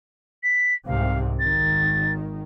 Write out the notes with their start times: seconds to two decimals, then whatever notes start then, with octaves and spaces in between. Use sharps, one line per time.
0.43 B6
0.87 C2 G#2 C3 F5
1.39 G#1 D#3 A6